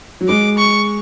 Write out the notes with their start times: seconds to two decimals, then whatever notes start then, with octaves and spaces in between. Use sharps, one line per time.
0.21 F#3
0.29 G#3 D6
0.57 C#6